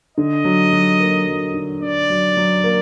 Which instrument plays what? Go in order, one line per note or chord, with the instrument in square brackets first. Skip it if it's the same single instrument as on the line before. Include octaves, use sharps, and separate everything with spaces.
[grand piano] D3 [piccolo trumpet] D#5
[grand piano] F#3
F#3
A#3
F#3
D3
[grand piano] D3 [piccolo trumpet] D5
[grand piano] F#3
F#3
A#3